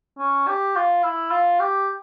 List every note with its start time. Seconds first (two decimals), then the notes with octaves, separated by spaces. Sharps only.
0.19 C#4
0.48 G4
0.76 F4
1.04 E4
1.31 F4
1.60 G4